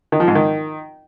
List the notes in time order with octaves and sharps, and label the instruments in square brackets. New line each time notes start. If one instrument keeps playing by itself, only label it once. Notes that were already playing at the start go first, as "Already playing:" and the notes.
[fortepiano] D#3
F3
G#2
D#3